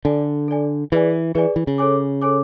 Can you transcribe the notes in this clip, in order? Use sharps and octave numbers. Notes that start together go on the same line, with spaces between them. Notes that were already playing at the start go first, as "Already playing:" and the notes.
D3 A4 D5 G#5
A4 D5 G#5
E3 G#4 B4 D5 G#5
E3 G#4 B4 D5 G#5
E3
C#3
A4 C#5 G#5 D6
A4 C#5 G#5 D6